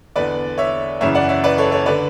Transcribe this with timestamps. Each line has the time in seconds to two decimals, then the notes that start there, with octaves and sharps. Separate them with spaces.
0.16 E2 D3 B4 D5
0.58 C#5 E5
1.01 F#2 C#3 E3 C#5 E5
1.15 D5 F#5
1.29 C#5 E5
1.44 B4 D5
1.58 A4 C#5
1.71 A4 C#5
1.86 D3 B4 D5